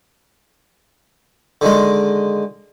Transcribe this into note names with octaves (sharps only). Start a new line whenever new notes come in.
D3 D#3 G#3